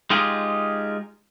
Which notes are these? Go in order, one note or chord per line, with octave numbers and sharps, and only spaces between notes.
G#3 D#4 F4 G4 G#4